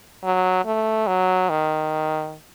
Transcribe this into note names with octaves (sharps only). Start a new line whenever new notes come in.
F#3
A3
F#3
D#3